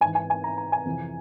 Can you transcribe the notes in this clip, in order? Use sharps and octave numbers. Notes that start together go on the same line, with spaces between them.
G#2 E3 G#5
G#5
G#5
A#5
A#5
G#5
F2 C3 E3